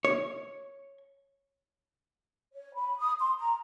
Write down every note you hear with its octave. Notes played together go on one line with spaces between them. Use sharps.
C#5
C#5
B5
D#6
C6
A#5